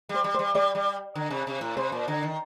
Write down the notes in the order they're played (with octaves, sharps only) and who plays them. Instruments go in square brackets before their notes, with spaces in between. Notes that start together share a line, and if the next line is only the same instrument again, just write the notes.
[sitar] G3 [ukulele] C5
[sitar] G3
[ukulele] C5
[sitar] G3
[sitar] G3 [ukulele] D5
[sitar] G3
D3
C3
C3
A2
[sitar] C3 [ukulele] C5
[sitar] A#2
D3
D#3